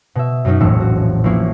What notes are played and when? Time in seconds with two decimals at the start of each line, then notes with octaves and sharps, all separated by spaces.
0.15 B2 E5
0.45 F#2 F#3 C#4 D#4
0.60 E1 A#1 A2 E6 C#7
0.80 F#4
1.24 A1 F3 A#3 E4 C#6 C7